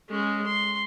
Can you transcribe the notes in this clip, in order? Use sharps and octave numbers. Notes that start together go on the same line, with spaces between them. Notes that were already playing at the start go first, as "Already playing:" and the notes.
G#3 C#4
C6